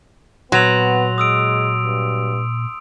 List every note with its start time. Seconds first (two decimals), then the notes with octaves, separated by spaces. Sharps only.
0.52 A#2 F#3 B3 C6 F7
1.18 G#3 D#6 E6 D7
1.81 G2